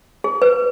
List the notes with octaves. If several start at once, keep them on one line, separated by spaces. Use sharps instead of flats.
G#4
B4